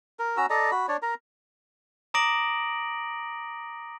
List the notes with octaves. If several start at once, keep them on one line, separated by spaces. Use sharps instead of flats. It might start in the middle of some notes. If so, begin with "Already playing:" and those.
A#4
C#4 F#4 A#5 E6
A4 D5 D#5 A#5
F#4 B5
D4 C#5 D5
A#4 A#5
A#5 D6 D#6 A#6 D7 F#7